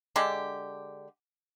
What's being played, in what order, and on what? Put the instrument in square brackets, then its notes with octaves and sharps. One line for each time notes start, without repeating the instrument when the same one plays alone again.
[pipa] D3 G#3 D4 G4